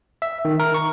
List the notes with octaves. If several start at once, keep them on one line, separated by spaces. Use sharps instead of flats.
E5
D#3
A#4
C#6